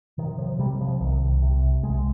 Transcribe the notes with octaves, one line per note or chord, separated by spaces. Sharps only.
C3 D#3
F3
C3 G3
F3
C2 D#3
C3
C2 G#3